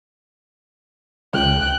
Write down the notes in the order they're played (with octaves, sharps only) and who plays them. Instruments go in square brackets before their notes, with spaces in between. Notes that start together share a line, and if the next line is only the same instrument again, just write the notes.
[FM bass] C#2 [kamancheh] G5 F#6